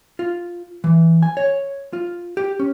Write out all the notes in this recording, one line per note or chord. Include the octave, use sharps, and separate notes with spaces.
F4
E3
G#5
C#5
F4
G4
C#4